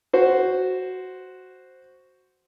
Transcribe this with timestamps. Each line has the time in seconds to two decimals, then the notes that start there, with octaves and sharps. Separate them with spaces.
0.13 F#4 C5